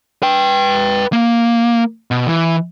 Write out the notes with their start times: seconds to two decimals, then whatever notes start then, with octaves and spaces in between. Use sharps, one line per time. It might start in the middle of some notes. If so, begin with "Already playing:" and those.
0.23 B4 G5
1.13 A#3
2.11 B2
2.27 E3